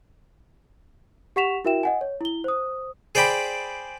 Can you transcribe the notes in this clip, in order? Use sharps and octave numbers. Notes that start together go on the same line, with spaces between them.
G4 F#5 C#6 B6 E7 F7
E4 F#4 A#4 E5 G5 E7
D#5 F#5 G#5
C#5
E4 G7
C5 D#6
G#4 C5 D5 G5 B5